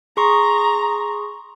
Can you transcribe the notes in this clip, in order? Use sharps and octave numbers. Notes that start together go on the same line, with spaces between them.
G#4 A#5 C6 C#6